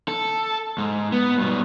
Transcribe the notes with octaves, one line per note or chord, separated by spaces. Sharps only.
A4
G#2
B3
G2 B2